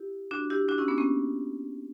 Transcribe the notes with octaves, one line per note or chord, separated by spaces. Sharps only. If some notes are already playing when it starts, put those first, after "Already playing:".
Already playing: E4 G4
D4 F#4
E4 G4
D4 F#4
C#4 E4
B3 D4
A#3 C#4